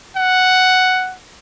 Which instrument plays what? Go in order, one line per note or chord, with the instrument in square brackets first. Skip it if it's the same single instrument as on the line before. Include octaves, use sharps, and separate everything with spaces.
[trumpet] F#5